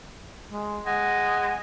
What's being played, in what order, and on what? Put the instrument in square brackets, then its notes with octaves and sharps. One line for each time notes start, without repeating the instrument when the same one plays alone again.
[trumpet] G#3
[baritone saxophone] G#3 [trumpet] F#5